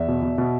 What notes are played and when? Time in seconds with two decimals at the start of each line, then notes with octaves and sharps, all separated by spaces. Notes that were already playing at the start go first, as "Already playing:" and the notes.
Already playing: E2 E5
0.08 B2
0.22 B2
0.38 B2